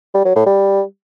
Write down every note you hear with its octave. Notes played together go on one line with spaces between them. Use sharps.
G3
F#3
A2
G3